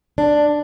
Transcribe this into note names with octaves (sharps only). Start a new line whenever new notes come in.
D4